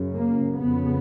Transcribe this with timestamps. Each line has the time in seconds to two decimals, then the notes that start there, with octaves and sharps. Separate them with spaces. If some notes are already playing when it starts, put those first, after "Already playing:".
Already playing: F#2 C#3
0.13 A#3
0.57 F2 C#3 B3